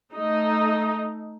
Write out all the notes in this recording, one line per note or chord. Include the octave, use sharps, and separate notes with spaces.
A3 D#4